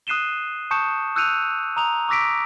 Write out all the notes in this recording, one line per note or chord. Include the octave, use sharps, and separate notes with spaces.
D#6 F#6 C7 D#7 E7 G7
A5 C#6 D#6 G6 C#7 E7
E6 F#6 G6 C#7 D#7 F7
A#5 D#6 F7
C#6 D6 E6 A#6 B6 D7